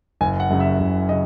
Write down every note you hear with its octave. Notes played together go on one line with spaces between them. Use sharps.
F#1 G#5
F#5
F#2 C#3
E5
F#1
C#3 D#5